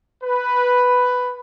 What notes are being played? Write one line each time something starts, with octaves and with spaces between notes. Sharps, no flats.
B4